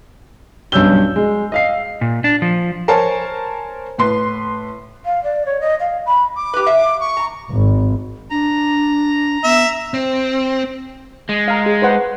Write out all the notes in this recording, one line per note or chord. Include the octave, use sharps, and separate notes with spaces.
B1 G2 C#4 E6 G6 G7
G#3
D#5 F5 C7
A#2
D4
F3
A#4 C5 C#5 G#5 A5
A2 B4 C6
F5
D5
C#5
D#5
F5
B5
D6
G4 B4
E5 F5
C#6
A#5
G#1
D4 A#5
B3 E5
C4
G#3
F5 A#5
G#4
B4 C5 F#5